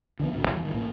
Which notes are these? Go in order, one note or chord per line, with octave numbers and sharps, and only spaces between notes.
D3 D#3 F3 B3
A1 D2 A2
E2 E3 G3
G1 D#3
A1 A2 A#3